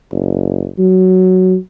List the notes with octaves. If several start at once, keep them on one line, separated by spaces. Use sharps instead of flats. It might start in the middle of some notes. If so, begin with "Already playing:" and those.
F#1
F#3